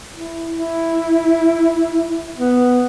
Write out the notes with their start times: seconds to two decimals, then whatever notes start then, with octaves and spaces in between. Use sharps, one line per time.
0.13 E4
0.54 E4
2.36 B3